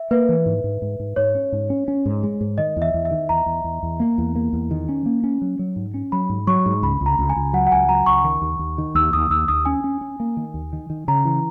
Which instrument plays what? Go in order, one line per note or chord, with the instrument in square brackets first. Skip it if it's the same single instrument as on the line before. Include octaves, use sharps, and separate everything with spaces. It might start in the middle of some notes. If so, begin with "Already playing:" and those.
Already playing: [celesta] E5
[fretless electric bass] A#3 [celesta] B4
[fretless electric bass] E3
G#2
G#2
G#2
G#2
[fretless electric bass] G#2 [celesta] C#5
[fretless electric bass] C#4
G#2
C#4
C#4
G#2
G#3
G#2
[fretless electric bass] D#3 [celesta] D#5
[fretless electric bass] E2
[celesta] E5
[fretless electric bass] E2
[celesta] E5
[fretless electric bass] D#3
[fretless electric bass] E2 [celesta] A#5
[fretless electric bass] E2
E2
E2
A#3
E2
A#3
E2
D#3
C#4
A#3
C#4
F#3
F#3
G#2
C#4
[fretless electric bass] F#3 [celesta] B5
[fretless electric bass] G#2
[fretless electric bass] F#3 [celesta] C#6
[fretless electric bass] G#2
[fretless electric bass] C#2 [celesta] B5
[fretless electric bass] C#2
[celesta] A#5
[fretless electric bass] C#2
[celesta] G#5
[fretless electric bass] C#2
[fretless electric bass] F#3 [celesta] F#5
[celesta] F#5
[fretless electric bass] C#2 [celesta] G#5
[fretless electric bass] F#3 [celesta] A#5
[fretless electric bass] C#2 [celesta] C#6
[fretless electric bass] D#3
D#2
D#2
D#3
[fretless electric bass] D#2 [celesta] E6
[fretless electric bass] D#2 [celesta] D#6
[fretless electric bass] D#2 [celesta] E6
[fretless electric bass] D#2 [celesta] D#6
[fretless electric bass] C#4 [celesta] G#5
[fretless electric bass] C#4
C#4
A#3
D#3
D#2
D#3
D#3
[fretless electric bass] C#3 [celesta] A#5
[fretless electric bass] E3